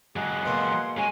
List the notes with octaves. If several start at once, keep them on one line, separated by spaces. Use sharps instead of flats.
F#3 G#3 G#4 F#5
B2 A#3 C6
G#3 C#4 F#4 G#5